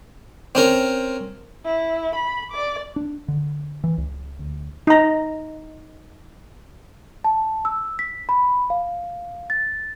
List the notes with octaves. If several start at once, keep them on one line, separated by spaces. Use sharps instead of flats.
C4 C#4 A#4
E4
B5
D5 D6
D4
D3
E3
C#2
D2
D#4 A#5
A5
E6
B6
B5
F5
A6